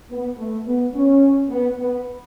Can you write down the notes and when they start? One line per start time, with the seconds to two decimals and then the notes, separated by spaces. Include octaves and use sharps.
0.11 B3
0.38 A3
0.66 B3
0.95 C#4
1.50 B3
1.79 B3